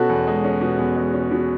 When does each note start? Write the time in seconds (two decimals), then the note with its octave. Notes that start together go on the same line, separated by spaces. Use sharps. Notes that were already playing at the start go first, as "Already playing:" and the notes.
Already playing: B2 C#4 F#4 A4
0.09 E2
0.27 G#3
0.44 C#4
0.61 B2
0.79 E2
0.97 G#3
1.14 C#4
1.31 B2